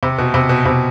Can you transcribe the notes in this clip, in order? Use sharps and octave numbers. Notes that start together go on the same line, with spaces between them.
C3
B2
C3
B2
C3